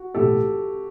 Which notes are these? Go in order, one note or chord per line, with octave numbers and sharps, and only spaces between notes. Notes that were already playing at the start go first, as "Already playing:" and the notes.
Already playing: F#4
B1 A2 E3 G4 A4